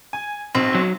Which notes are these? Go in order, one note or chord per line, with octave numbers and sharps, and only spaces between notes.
G#5
B1 C4
F#3